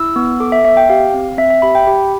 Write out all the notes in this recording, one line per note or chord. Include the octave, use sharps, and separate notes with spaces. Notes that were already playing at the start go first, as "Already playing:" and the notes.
Already playing: E4 E6
B3
A4 D6
E5
B3 E5
G5
G4 F5
C4
C4 E5
E5
G4 B5
G5
G4 B5